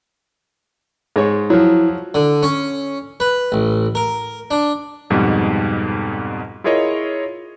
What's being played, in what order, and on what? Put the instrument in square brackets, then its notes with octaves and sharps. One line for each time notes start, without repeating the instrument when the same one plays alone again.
[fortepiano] G#2 G#3 C#5
[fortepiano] F3 F#3 [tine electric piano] E4
[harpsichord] D3
C#4
B4
A1
A#4
D4
[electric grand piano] F2 G#2 B2 G3
E4 F4 G#4 A#4 C#5 D#5